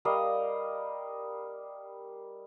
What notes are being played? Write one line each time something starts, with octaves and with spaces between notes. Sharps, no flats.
G3 A#4 D#5 F5